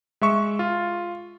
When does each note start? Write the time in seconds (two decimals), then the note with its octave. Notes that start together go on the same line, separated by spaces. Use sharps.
0.21 G#3 E5 C#6
0.59 F4